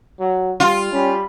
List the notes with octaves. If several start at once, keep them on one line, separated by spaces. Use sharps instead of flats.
F#3
G3 F4
G3 C#4 B5